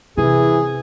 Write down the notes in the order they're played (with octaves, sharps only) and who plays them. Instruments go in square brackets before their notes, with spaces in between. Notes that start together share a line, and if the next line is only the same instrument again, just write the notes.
[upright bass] C3 [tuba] E3 [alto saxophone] G#4